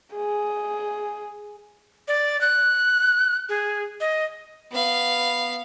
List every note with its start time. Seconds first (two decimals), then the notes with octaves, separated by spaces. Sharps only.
0.15 G#4
2.08 D5
2.41 F#6
3.49 G#4
4.01 D#5
4.71 B3 F5